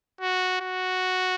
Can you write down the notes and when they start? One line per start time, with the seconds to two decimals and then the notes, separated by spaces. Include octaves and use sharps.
0.21 F#4
0.61 F#4